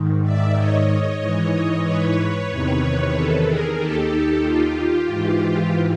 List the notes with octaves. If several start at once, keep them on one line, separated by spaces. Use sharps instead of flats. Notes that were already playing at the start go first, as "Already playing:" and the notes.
Already playing: G#2 D#3
D5 E5
C#5 D#5
G#2 E3
B4 C#5
E2 C3 D#3
A4 B4
G#4 A#4
D#2 D#3 G4 A4
F4 G4
G#2 E3